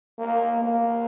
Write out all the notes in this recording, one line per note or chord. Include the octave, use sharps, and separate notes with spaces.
A#3
A#3